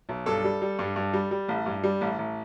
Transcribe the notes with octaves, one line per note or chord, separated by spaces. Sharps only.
B1
G2 A4
G3
G3
G2
G2
G3
G3
A1
G2
G3
A1
A1